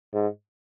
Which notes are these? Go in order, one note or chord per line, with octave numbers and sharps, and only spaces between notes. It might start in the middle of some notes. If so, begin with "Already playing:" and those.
G#2